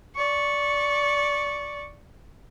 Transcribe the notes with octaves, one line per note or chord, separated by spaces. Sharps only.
D5 C#6